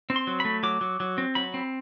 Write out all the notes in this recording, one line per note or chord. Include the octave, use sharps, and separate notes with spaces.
C4
C6
F#3
A3 B5
F#3 D6
F#3
F#3
C4
F#3 B5
C4